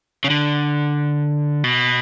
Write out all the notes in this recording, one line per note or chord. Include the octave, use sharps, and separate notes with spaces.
C#3
D3
B2